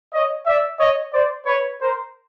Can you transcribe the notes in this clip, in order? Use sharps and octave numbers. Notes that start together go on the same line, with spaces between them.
C#5 D#5
D5 E5
C#5 D#5
C5 D5
B4 C#5
A#4 C5